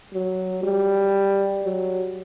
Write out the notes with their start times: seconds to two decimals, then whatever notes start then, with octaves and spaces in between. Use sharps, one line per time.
0.13 F#3
0.63 G3
1.63 F#3